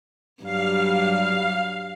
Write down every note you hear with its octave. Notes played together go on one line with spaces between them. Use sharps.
G2 F#3 G3 F5